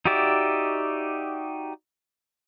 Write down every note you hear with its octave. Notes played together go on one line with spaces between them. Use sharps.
D#4 F#4 G4 D5 E5